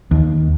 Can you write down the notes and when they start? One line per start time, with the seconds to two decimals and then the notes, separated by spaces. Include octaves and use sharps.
0.11 D#2